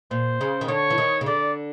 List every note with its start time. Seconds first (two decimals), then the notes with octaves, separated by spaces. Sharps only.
0.11 A#2 C5
0.41 C#3
0.61 D#3
0.68 D3 C#5
0.90 E3
0.98 D#3
1.21 C#3
1.26 D3 D5